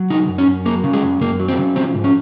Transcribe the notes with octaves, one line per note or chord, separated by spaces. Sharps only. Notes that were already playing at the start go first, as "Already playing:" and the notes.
Already playing: F#3
C#3 D#4
F#2
C#4
F#2
F#3 A#3
C#3
G#3
F#2
F#2 A#3
F#3
C4
C#3
F3 C4
G#2
C#4